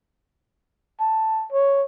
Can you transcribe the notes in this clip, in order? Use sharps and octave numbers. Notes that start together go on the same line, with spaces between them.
A5
C#5